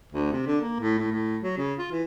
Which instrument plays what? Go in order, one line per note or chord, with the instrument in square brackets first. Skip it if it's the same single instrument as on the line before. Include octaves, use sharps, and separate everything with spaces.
[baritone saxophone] D2
C3
D3
A#3
A2
A2
A2
F#3
C#3
F4
E3